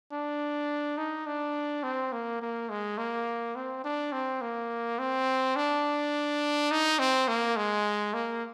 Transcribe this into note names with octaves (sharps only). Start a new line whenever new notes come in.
D4
D#4
D4
C4
A#3
A#3
G#3
A#3
C4
D4
C4
A#3
C4
D4
D#4
C4
A#3
G#3
A#3